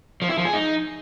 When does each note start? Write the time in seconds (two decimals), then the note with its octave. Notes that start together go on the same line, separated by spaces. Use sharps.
0.22 F3
0.30 E4
0.37 F3
0.45 G#4
0.53 D#4